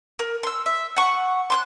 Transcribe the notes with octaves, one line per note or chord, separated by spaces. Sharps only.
A#4
C6 E6
E5
F#5 C#6
C6 D6 F#6